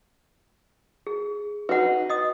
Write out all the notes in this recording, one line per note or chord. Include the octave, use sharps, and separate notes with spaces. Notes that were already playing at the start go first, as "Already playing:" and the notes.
G#4
D#4 F#4 B4 F#5
D#5 D#6